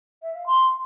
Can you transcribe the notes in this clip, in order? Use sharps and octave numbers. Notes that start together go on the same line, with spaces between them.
E5
F5
C6